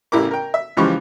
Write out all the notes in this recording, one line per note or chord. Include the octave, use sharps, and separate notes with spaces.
A1 C#3 E4 G4 A#4 D6
A#4 G5
E5
C#2 C#3 E3 F3 G4 C#6